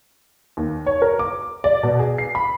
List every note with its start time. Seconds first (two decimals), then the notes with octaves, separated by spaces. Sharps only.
0.57 D#2
0.86 C#5
1.02 A#4
1.19 D6
1.64 D5
1.83 B2
1.99 G#4
2.18 C7
2.35 B5